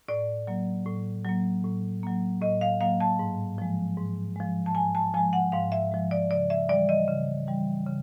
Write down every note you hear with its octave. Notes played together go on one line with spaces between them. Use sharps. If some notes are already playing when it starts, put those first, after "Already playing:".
A2 D5
F#3 A#3
A2
F#3 A#3
A2
F#3 A#3
A2 D#5
F5
F#3 A#3 F5
A5
G#2
F3 G#3
G#2
F3 G#3
A5
G#2 G#5
A5
F3 G#3 G#5
F#5
G#2 F5
E5
F3 G#3
D5
C#3 D5
E5
E3 G3 D5
D#5
C#3
E3 G3
C#3